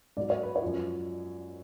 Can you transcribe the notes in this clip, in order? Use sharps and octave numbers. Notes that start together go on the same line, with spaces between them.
G#2 F#3 D5
C#5
B4
C#5
F#2 F3